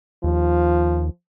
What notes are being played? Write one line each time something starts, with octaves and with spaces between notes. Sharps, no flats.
D#2 F3